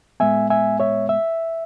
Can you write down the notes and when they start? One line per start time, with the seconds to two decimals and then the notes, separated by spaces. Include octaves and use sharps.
0.20 A2 G#3 B3 E5 G#5
0.50 E5 G#5
0.80 C#5 E5
1.09 E5